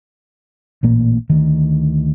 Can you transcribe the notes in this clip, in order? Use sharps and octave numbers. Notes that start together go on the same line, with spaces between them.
A1 A#2 A#3
D2 D#3